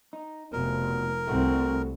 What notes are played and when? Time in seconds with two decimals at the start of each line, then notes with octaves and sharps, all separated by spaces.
0.13 D#4
0.53 F1 B2 A#4
1.27 C2 A3 C4 F#4